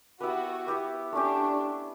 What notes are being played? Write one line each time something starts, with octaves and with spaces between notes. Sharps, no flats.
B3 E4 F#4 G4 B4
B3 E4 G4 B4
A3 C#4 D4 G4